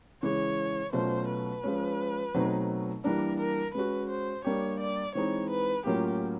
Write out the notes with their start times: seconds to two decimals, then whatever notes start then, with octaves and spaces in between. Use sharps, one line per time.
0.23 C#3 E3 G#3 C#5
0.93 B2 F#3 A3 C#4 F4 C5
1.28 B4
1.63 F3 G#3 C#4
2.35 B2 F#3 A3 C4 D#4
3.04 E3 G3 A#3 D4 A#4
3.40 A#4
3.75 G#3 C#4 F#4 B4
4.10 C5
4.44 G3 A#3 D4 G4 C#5
4.80 D5
5.15 E3 G#3 C4 D#4 C#5
5.50 B4
5.86 A2 F#3 A#3 C#4 F4 G4